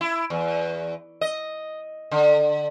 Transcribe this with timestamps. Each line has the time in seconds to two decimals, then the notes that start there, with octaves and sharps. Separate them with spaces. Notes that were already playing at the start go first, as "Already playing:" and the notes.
0.01 E4
0.30 E2
1.21 D#5
2.11 D3